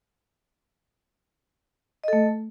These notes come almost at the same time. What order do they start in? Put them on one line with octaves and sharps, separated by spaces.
D#5 A4 A3